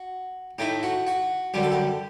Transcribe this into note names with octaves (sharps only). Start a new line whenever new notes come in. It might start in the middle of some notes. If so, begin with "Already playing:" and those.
Already playing: F#4
A2 A3 D#4 G4
F#4
F#4
F#2 D3 G3 G4
A4
G4